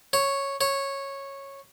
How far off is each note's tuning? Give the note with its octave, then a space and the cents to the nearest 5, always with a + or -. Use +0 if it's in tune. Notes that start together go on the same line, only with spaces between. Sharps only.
C#5 -5
C#5 -10